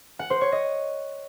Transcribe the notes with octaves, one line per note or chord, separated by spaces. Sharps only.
F#5
C5
C#5
D#5